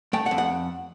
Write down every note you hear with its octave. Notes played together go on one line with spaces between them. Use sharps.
A3 G5
F#5
F2
F#5